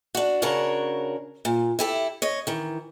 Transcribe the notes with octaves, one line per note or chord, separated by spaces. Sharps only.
D4 F#4
C#3 D4 F#4 A#4 C#5
A#2
E4 G4 A4
C#5 D#5
D#3 E3